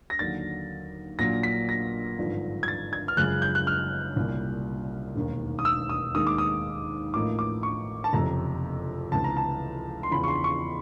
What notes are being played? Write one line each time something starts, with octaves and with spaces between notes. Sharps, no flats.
A#6
D#2 D3 F#3 A6
A#1 A#2 F#3 A#3 A#6
B6
A#6
G#1 G2 D3 F3
G#6
A6
G#6
F6
F#1 F#2 C#3 F3 G#3 F#6
G6
F#6
F6
C2 A#2 G3
E1 D#2 D#3
D#6
E6
D#6
D#2 D#3 G#3 D#6
D6
D#6
A1 A2 F3 A#3 D#4 D6
D6
C#6
A5
F#1 F2 C3 A#5
C#2 C3 E3 A5
A#5
A5
C6
E2 C#3 F3 B5
C#6
C6
C#6